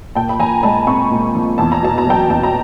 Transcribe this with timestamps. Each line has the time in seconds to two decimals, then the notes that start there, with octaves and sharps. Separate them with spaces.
0.15 A#2 G5 A5
0.29 B5
0.39 F3 G#5 A#5
0.63 G#3 A5 B5
0.87 C4 B5 C#6
1.11 A#2
1.35 F3
1.58 E2 A5
1.72 A#5
1.83 B2 A5
1.98 A#5
2.06 F#3 G5 A5
2.29 E2 A5
2.43 A#5